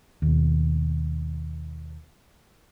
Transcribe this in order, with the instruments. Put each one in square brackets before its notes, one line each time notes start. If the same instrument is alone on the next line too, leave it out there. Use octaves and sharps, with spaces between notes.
[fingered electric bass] D#2 B2